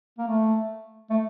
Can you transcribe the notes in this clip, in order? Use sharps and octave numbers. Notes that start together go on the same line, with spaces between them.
A#3
A3
A3